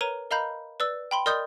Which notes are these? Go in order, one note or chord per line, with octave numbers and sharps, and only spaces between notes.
A#4 B4 C#5 A#5 D#7
A#4 D#5 F5 A#5 B5 G6
B4 D5 E6
G5 B5 C6
A#4 D5 D#5 C6 D#6 G6